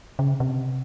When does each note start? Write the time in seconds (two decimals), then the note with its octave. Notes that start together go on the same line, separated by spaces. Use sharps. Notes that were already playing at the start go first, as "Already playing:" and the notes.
0.19 C#3
0.40 C3